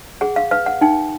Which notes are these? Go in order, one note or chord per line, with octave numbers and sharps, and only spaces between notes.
G#4 F#5
F5
B4 F5
F#5
D#4 G5